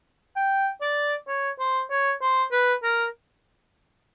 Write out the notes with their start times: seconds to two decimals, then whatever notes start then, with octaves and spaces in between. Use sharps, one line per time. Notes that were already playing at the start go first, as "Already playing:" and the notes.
0.36 G5
0.81 D5
1.28 C#5
1.59 C5
1.90 C#5
2.22 C5
2.52 B4
2.83 A#4